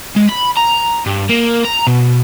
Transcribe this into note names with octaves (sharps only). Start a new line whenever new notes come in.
G#3
B5
A#5
G2
A#3
A#5
B2